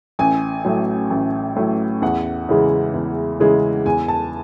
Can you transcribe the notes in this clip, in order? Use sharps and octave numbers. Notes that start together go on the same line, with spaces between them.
A1 G#5
A2 F#3
A1
A2 F#3
E2 F#5
C#3 E3 G#3
E2
C#3 E3 G#3
E2 G#5
A5